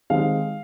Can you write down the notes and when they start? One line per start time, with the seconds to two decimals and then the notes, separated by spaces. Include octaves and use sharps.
0.10 D#3 G#3 C4 F5